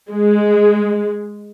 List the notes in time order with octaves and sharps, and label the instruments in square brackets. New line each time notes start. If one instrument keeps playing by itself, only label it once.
[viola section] G#3